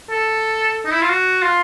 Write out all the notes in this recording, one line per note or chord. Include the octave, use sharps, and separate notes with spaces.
A4
D#4
E4
F4
F#4
F4